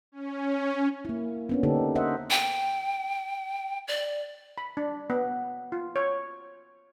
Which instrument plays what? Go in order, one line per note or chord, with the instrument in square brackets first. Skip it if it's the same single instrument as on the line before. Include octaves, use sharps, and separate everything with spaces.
[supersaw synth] C#4
[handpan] A#3 E4
B3 C#4 D4
D3 A#3 D#4 G4 A4
A#4 C5 D#5 E5 F#5
[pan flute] G5
D5
[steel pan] B5
D4
B3
F4
C#5